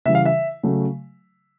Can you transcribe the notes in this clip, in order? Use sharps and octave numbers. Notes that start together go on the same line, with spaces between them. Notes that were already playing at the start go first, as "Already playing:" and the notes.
C#3 E3 G3 E5
F5
E5
C#3 F#3 A3